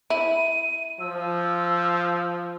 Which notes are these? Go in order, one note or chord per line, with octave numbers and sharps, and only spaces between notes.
E4 D#7
F3 E6